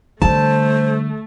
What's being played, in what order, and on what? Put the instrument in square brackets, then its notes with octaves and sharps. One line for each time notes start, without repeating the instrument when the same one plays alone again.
[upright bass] D3 G3 [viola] A3 [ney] C5 [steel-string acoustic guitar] A5